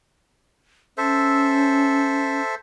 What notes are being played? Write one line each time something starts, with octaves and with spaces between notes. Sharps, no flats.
C#4 A4 C5 E5